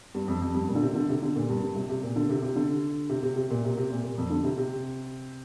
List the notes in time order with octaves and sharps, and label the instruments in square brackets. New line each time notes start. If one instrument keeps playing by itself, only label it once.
[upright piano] G2
F2
F2
G2
A#2
D3
C3
D3
C3
D3
A#2
G2
G2
C3
C3
A#2
D3
C3
C3
D3
C3
C3
C3
A#2
C3
C3
A#2
A#2
F2
D3
C3
C3